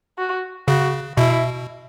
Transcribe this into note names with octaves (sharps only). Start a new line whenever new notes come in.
F#4
C#3 F#4
B2 E4